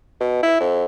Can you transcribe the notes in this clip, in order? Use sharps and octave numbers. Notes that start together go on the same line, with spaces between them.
B2
E4
F2